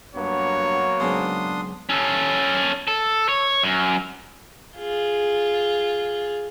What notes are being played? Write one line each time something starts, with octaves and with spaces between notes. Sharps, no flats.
G2 F#3 A#3 B3 C#5
B1 G#2 C#3 D4 C6 D#6
C#4 A4
A4
C#5
F#2
F4 G#4